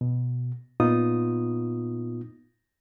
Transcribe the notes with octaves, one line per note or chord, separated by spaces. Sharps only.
B2
A#2 B3 D#4 F4 D#6